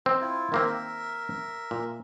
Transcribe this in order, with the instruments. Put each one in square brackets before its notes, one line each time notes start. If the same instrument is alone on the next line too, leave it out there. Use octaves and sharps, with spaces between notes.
[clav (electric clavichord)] C4 [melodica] D#4 D#5
[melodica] E4 F4
[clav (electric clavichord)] D#3 A#3 C4 [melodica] A#4 E5
[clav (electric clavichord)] A#2